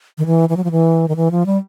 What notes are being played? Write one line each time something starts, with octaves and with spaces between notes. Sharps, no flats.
D#3
E3
E3
F#3
F3
E3
D#3
E3
F3
G3